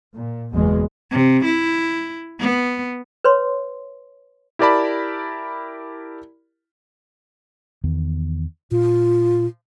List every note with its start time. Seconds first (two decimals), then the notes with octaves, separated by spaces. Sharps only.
0.16 A#2
0.54 F#1 E2 B2 G#3
1.11 C3
1.45 E4
2.40 B3
3.24 B4 C#5 C6
4.59 E4 G4 A#4 D5 A5 B5
7.84 E2 D#3 B3
8.71 A#2 F4